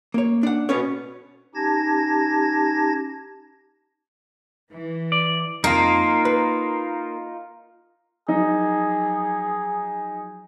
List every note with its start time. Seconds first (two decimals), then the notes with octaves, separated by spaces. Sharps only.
0.14 A#3 C#5
0.43 D4 F#5
0.69 B2 B3 C#4 C#5
1.55 C#4 D#4 G4 A5 G#6 A#6
4.72 E3
5.12 D5
5.64 F2 A#3 D#4 F4
6.25 B4
8.28 F3 F#3 D#4 G#4